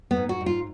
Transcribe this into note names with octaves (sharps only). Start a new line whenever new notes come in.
B3
G#2
F#4
G#2
F4